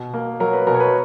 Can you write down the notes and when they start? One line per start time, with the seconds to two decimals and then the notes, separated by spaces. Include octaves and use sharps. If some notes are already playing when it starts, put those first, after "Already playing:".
Already playing: B2
0.14 A#3
0.40 F#3 A#4
0.53 B4
0.67 B2 A#4
0.74 C#5
0.80 B4